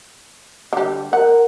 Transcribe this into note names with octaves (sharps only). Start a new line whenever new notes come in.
D3 G3
A#4 F#5